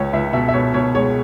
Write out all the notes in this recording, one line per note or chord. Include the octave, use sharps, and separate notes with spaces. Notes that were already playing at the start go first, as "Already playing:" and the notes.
Already playing: C#2 C#5
C#2 E5
B2 E5
E5
B2 C#5
B2 C#5
G#3 C#5